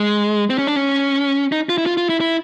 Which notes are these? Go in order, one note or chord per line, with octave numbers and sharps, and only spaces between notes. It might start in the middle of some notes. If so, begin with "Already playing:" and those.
Already playing: G#3
C4
C#4
D4
C#4
D#4
F4
E4
F4
F4
E4
E4